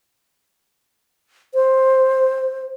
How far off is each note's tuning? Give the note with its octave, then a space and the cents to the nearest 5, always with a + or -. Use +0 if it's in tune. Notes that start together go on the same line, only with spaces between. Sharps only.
C5 +10